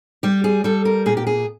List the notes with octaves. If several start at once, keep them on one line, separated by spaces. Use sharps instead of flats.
G3 G4
G#4
G3 A4
A#4
A#2 G#4
G4
G#4